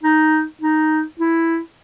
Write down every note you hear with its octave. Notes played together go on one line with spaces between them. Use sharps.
D#4
D#4
E4